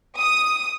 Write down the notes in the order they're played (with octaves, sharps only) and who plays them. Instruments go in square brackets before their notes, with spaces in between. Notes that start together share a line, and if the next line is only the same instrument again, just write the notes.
[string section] D#6